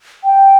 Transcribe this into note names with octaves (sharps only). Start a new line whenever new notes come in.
G5